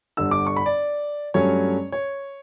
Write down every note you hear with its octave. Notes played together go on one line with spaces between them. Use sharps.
G1 G2 D3 E6
D6
C#6
B5
D5
G2 F#3 A3 C#4 C#5
C#5